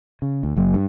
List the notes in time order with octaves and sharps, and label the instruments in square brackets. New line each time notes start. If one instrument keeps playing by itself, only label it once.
[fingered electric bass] C#3
D2
F#1 F#3 A#3
G2